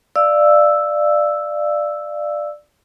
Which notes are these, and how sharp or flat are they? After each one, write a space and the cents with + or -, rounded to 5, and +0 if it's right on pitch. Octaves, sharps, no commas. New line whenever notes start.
D5 +15 F5 -20 E6 +0